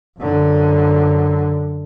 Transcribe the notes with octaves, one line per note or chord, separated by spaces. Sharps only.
F#2 D3